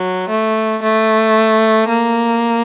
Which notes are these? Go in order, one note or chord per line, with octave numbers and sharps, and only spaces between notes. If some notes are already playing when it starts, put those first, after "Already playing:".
Already playing: F#3
A3
A3
A#3